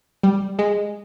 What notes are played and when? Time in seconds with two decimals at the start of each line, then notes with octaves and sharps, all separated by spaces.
0.23 G3
0.59 G#3